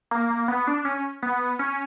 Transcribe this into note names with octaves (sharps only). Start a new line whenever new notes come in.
A#3
A#3
B3
D4
C#4
B3
C#4